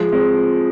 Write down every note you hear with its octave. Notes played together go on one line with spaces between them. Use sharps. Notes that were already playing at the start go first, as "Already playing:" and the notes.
Already playing: F3 G#3
G#3 C4